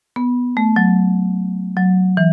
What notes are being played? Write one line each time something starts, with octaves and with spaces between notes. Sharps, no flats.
B3
A3
F#3
F#3
E3